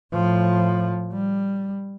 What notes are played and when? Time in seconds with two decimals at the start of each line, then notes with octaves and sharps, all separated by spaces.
0.13 A2 F3
1.13 G3